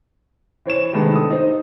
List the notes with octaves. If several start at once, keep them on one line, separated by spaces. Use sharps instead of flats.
E3 C5 C#5 E7
C3 D#3 G#3 A3 B3 D4
A4 D#6
D#4 C5